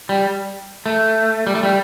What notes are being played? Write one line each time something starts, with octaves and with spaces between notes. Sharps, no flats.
G3
A3
G3
A3
G3